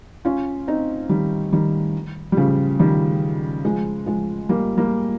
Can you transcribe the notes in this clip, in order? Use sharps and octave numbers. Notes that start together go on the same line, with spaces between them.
C#4 F4
C4 D#4
D#3 G3
D#3 G3
G3
C#3 F3
D#3 G3
F3 G#3
F3 G#3
G3 A#3
G3 A#3